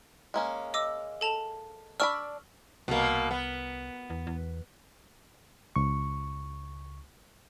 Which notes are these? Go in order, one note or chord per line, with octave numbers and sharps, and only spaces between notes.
G#3 A#3 C#4
D#5 D6 E6
A4 A5 F7
D4 D5 B5 C#6 E6 F6
C2 B2 A#3
B3
E2
E2
C#2 C#6